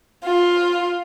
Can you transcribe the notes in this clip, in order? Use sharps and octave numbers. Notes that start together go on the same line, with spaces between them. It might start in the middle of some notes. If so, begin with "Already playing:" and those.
F4